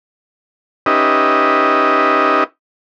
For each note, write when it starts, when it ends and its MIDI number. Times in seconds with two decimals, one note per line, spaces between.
0.86 2.44 61
0.86 2.44 63
0.86 2.44 67
0.86 2.44 71
0.86 2.44 75
0.86 2.44 76